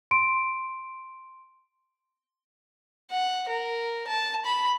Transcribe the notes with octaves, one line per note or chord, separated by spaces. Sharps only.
C6 D7
F#5
A#4
A5
B5